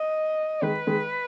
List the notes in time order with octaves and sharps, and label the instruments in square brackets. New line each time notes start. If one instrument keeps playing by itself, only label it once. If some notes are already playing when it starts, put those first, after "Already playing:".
Already playing: [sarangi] D#5
[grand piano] D#3 G#3 [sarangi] B4
[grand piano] D#3 G#3